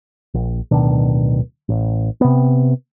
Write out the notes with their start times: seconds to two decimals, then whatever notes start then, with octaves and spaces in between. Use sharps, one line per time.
0.34 A#1
0.71 D1 B2 D#3 D4
1.69 A1
2.21 C3 B3